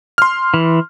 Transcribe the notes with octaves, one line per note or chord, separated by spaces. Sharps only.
C6 F6
E3